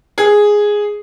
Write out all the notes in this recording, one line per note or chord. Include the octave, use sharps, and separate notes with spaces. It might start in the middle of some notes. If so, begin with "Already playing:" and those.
G#4